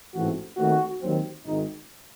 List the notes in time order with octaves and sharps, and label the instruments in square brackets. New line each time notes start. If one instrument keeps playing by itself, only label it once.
[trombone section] A1 G#2 E3 A3 C4 F#4
D#2 D#3 A3 C4 F#4
D#2 D#3 F#3 C4
G#1 G#2 D#3 D#4